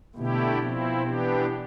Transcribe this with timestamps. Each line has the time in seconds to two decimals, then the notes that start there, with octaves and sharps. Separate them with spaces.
0.15 B2 D3 A3 E4 G4
0.59 B2 F3 C4 E4
1.03 E3 B3 D4 G4